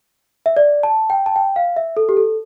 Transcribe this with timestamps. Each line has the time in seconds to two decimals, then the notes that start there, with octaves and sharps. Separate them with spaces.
0.46 E5
0.57 D5
0.83 A5
1.10 G5
1.26 A5
1.36 G5
1.56 F5
1.77 E5
1.97 A4
2.09 G4
2.17 A4